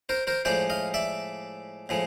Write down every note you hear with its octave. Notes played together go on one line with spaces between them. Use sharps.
A#4 C5
A#4 C5
A2 F3 G#3 C5 D5
D#5 F5
D5 E5
A2 F3 G#3